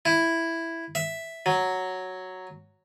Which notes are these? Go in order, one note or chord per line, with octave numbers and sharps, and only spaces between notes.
E4
E5
F#3